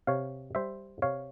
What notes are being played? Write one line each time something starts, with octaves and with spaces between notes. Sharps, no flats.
C3 C#5 F5
G3 C5 E5
C3 C#5 F5